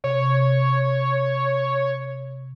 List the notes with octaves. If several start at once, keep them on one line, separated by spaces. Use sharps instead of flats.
C3 C#5